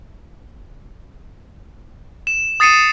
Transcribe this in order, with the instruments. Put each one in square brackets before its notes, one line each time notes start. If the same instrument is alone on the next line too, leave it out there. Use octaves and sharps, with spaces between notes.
[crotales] E7
D#6 A6 C7 C#7 D#7 E7